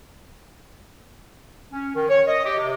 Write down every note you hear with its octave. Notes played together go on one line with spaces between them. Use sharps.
C#4
D#3
C#5
D#5
G4
C3